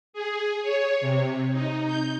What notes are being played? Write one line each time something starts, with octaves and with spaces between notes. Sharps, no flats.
G#4
C#5
C3
D#4
G6